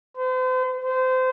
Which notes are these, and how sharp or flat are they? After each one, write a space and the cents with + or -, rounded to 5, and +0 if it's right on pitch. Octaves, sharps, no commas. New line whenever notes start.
C5 -40
C5 -25